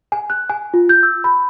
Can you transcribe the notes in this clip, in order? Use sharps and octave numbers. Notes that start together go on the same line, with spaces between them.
G#5
F#6
G#5
F4
G6
E6
B5